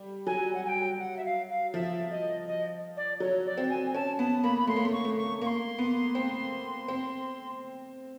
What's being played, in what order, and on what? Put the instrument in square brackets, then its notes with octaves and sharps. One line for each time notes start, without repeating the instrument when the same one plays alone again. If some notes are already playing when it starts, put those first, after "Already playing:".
Already playing: [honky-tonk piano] G3
[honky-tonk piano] F#3 [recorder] G#5
[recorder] F#5
G#5
G5
F#5
E5
F5
F5
[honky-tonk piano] F3 [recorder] E5
[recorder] D#5
D#5
D5
[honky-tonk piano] F#3 [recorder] C#5
[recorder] D5
[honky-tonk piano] C4
[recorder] G#5
[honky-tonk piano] C#4 [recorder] A5
[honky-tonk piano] B3 [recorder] A5
[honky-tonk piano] A#3 [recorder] B5
[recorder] B5
[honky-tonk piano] A3 [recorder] C6
[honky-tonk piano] A#3
A3
[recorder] C#6
[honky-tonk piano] A3
[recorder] C#6
[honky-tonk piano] A#3 [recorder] C#6
[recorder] C6
[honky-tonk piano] B3
C4
C4